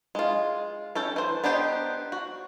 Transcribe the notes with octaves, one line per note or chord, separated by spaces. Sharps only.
G#3 F4
C#4 A4 G5
E3 C5
B3 D4 D#4 G4 C5
F#4